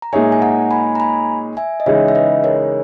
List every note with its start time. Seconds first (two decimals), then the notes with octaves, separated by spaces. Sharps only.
0.02 A#5
0.13 A#2 G#3 D#4 G#4 C#5 E5 G#5
0.32 G#5
0.42 F#5 A#5
0.71 G#5 B5
0.95 A#5
1.00 G#5 B5
1.57 E5 G#5
1.80 D#5
1.86 C#3 E3 G#3 D#4 C#5 E5
2.08 E5
2.15 B4 D#5
2.44 A#4 C#5